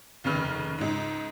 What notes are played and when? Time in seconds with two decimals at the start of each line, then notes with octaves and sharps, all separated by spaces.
0.24 F1 D#2 C#3 B4 F6
0.78 C#2 G#2